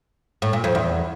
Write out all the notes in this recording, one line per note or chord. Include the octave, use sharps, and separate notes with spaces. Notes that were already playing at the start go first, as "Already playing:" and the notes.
A2
A#2
F2
E2